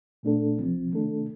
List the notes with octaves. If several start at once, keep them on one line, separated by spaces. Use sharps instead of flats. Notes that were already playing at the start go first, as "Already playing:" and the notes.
A#2 A3 D4 A4
C2 C3 F3 C4
C3 D#3 A3 D4 A4